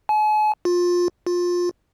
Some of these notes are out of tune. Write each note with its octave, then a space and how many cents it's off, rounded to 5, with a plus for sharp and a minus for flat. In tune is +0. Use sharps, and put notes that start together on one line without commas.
G#5 +45
F4 +20
F4 +20